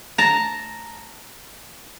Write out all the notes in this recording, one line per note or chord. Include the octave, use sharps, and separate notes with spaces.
A5 A#5